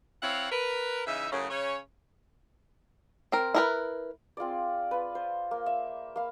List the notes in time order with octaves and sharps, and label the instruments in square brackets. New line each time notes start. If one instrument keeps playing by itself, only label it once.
[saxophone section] C4 E4 C#5 F5 F#5
A#4 B4
C#3 E3 D#4 E5
F#2 A2 C#3
C#3 C#4 C#5
[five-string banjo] C4 A#4
E4 A#4 B4
[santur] C4 F4 G#4 D5
F4 B4
C5
A#3
E5
A#3 F5 B5